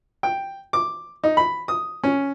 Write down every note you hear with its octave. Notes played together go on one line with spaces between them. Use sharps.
G5
D6
D#4
B5
D#6
C#4